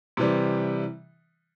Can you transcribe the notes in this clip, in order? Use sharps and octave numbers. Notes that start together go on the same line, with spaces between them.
C3 E3 G3